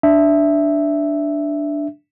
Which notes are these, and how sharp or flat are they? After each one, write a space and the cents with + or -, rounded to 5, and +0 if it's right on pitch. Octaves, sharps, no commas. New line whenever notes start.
D4 +0 E5 +0